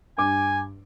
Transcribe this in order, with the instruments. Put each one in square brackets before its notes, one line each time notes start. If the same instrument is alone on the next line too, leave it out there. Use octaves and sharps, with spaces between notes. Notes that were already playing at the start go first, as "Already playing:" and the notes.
[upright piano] G2 D6 [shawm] G#5